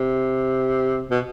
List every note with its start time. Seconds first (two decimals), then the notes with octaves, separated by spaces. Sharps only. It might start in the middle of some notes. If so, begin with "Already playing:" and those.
Already playing: C3
1.10 B2